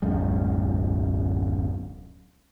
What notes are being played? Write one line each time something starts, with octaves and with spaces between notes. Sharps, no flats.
D1 B1 F#2 G#3